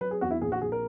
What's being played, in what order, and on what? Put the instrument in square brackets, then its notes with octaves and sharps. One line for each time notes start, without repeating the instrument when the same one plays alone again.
[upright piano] F#3 B4
G#4
E2 F#4
E4
A#1 G#4
F#4
A#1 G#4
A#4